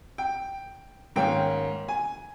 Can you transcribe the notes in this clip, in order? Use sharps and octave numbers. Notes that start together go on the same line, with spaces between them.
G5
G#2 D#3 A#3 C#4 G5
G#5